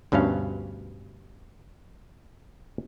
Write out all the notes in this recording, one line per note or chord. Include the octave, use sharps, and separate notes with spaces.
D2 G2 B2 C#4 F5